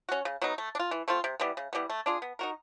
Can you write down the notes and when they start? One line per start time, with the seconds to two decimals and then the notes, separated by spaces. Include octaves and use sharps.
0.09 C#4 F#4
0.25 C#3
0.42 F#3 B3 D#4
0.58 A3
0.75 D4
0.79 F4
0.91 E3
1.08 A3 C4 F4
1.24 C3
1.40 E3 G3 B3
1.57 C#3
1.73 E3 G3 B3
1.90 A3
2.06 D4 F4 G#4
2.22 B3
2.39 D#4 F#4 A#4